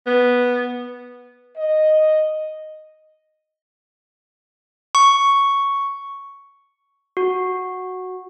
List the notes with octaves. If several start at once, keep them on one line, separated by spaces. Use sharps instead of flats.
B3
D#5
C#6
F#4